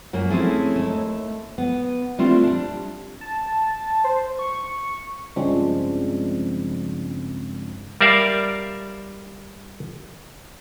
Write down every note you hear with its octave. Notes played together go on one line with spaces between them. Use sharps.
F#2 F#3 A#3
A3 C4 C#4 E4 G#4 A4
D#2 A3
B3
G3 A3 C4 D4 E4 F4
G3 D4
A5
C5
C#6
G2 C#3 F3 G#3 C4 D4
G3 A#4 D5 E5 F5